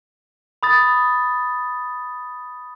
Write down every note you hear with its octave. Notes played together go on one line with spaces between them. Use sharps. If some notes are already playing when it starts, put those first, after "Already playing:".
B5 D#6 A6